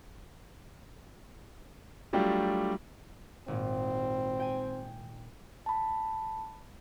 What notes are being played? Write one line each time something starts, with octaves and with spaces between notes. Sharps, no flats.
F#3 G3 A3 D4 F4 G4
G#1 A#2 C4
G5 G#5
A5 B5